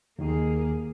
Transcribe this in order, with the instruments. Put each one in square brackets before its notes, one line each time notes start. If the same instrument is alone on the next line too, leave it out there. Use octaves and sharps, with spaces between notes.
[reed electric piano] D#2 D#3 [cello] A#3 G#4